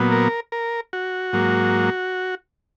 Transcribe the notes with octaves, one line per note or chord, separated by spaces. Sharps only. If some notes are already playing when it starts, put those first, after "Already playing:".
Already playing: A#2 F#3 B3
A#4
A#4
F#4
G#2 F#3 A#3